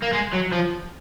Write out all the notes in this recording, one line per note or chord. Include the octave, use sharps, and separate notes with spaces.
A#3
G#3
F#3
F3